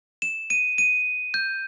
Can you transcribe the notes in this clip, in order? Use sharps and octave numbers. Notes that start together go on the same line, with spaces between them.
E7
D#7
D#7
G6